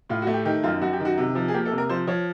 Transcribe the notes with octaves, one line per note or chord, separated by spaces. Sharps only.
A2 F4
F#4
A3
G4
D#3 G4
F#2 F4
F#2 F#4
G4
D#3
F#4
C3
F3
G#4
A#3 G4
A4
C3
A#4
F3 C5
F3 C#5